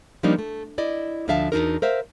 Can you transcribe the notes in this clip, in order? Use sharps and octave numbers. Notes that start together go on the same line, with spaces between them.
F3 G3 A#3 D4 D#4
A3
E4 D5 D#5
D2 F3 D4 E5 F5 A5
E2 D#3 D4 D#4 F#4 A#4
A#4 C5 E5 F5